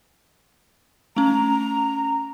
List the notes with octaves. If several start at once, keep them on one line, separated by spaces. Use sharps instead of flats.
A3 C#4 A#5